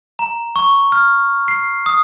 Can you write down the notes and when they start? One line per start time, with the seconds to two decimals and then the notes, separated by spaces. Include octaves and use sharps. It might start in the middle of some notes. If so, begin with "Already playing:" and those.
0.19 A#5
0.56 C#6
0.92 F6
1.48 C7
1.86 D#6